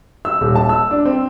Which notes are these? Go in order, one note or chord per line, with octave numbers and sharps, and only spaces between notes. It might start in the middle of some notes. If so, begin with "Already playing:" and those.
E6
D#1
A5
E6
D4
C4